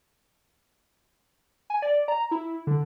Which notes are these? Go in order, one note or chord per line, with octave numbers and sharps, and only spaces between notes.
G#5
D5
A#5
E4
D3